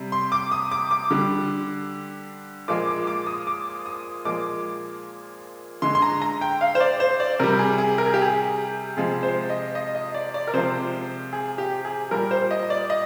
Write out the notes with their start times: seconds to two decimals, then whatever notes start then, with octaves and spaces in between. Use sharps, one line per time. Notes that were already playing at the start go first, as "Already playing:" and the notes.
Already playing: C3 G3
0.12 C6
0.32 D6
0.51 D#6
0.71 D6
0.91 D6
1.11 D3 G3
2.68 A#2 F3 G#3 D6
2.87 D6
3.07 D6
3.27 D#6
3.47 D6
3.86 D#6
4.25 A#2 F3 G#3 D6
5.82 D3 G#3 C6
5.95 C6
6.02 A#5
6.22 A#5
6.41 G5
6.61 F5
6.75 C5
6.80 D5
7.00 C5
7.20 D5
7.39 C3 G3 A#4
7.59 G#4
7.78 G#4
7.98 A#4
8.06 G#4
8.14 G4
8.22 G#4
8.97 C3 F3 G#3 G#4
9.23 C5
9.50 D#5
9.75 D#5
9.95 D#5
10.14 D5
10.34 D5
10.47 A#4
10.54 C3 F3 G#3 C5
11.33 G#4
11.58 G4
11.85 G#4
12.11 A#2 G3 A#4
12.31 C5
12.51 D#5
12.70 D5
12.90 D#5